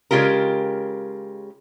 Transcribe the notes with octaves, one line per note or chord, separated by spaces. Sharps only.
C#3 G#3 F4 G4 A#4